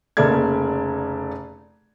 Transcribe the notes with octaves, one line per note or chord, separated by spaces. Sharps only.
F1 C#3 A#3 A4 D5 G#6